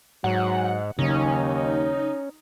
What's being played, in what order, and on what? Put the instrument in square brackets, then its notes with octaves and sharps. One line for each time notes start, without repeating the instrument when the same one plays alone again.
[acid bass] G#2 [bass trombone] F#3 [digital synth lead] F#5
[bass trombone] D#2 [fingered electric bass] C#3 F#3 [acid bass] C#4 [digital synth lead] D#4